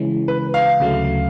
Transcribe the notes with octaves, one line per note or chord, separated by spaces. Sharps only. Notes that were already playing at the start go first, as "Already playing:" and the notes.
Already playing: C#3 E3 G#3 C#4
B4
F5
D2 C#3 F#3 A3